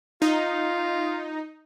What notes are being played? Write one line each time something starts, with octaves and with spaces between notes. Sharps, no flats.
D#4 F4